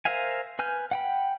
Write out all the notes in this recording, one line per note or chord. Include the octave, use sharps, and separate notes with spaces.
A#4 C5 E5 F5 G#5
B4 G#5 F6 G6
F#5 G5 B5